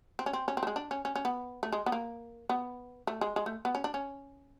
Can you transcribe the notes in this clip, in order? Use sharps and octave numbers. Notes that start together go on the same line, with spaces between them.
C4
C#4
C4
C#4
C4
A3
G#3
D4
C#4
C#4
C#4
B3
A3
G#3
B3
A#3
B3
A3
G#3
G#3
A3
B3
C#4
D4
C#4